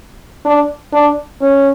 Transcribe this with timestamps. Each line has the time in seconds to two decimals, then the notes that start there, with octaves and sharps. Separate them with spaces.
0.45 D4
0.93 D4
1.41 C#4